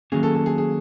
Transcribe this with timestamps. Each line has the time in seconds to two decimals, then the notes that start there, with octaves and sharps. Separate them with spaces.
0.12 D#3 F#3 A#3 C#4 G#4
0.23 A4
0.35 A4
0.46 G#4
0.58 G#4